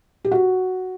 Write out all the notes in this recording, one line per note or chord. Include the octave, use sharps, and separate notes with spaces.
G4
F#4